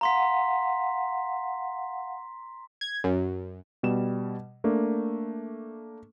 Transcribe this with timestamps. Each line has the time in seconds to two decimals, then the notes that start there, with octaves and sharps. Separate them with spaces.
0.01 F5 F#5 A#5 C6 B6
2.81 G#6
3.04 F#2
3.83 B2 G3 E7
4.64 A3 A#3 D4